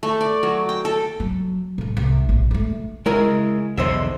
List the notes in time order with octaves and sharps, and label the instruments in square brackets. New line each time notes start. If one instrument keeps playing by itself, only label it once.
[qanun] A3
D5
F#3
G5
A4
[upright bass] F#3
A2 F#3
C2
A#1
A3 D4
[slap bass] C#3 G#3 [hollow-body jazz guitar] E4 A#4 D#5
[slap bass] B1 E2 D3 [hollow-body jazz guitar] C5 D#5 E5